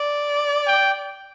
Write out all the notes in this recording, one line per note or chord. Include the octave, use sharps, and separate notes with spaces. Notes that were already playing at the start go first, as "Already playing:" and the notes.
Already playing: D5
G5